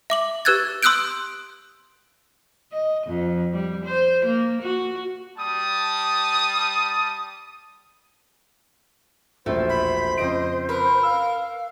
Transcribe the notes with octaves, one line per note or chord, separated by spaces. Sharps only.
E5 D6 F#7
G4 B4 E6 F#6 G#6 A6
C6 D#6 E6 F#6 G6 D7
D#5
F2
G3
C5
A#3
F#4
G3 A5 D#6
E1 A#1 A3 C5
B5
F2 C#3 D#5 D7
A#4 B4
F5 E6